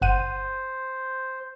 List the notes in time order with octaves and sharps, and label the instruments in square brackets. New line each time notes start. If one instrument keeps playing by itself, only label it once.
[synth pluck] G1 F#5 D#7 [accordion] C5